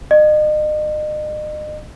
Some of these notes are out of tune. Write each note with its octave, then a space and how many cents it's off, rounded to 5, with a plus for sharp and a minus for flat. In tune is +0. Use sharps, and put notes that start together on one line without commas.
D#5 -40